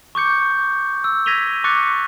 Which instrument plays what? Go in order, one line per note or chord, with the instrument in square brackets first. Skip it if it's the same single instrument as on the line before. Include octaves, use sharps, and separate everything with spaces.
[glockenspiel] C#6 D6 G6 C#7
E6
G#6 A#6 B6 D#7 F7 G7
C#6 D6 F#6 A6 C#7